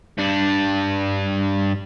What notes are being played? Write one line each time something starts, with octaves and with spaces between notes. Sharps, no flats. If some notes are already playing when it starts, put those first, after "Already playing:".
G2 D4